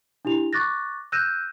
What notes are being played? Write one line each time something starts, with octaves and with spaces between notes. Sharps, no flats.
D4 E4 G4 F7
C#6 D6 F#6 A6 A#6
E6 F#6 G6 A#6 D#7 E7